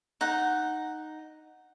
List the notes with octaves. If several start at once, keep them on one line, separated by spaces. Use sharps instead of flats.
D#4 F#5